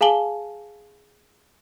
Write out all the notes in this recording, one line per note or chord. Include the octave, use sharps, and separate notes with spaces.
G#4 F5 G#5 A5 F#7 G7